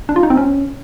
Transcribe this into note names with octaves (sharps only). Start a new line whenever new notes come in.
D4
F4
D#4
C4
C#4